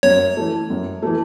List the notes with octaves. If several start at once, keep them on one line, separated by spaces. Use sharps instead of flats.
F#2 C#5
E3 A3
F#2
E3 A3